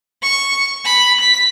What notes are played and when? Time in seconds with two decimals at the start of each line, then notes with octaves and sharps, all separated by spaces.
0.23 C#6
0.85 B5
1.21 B6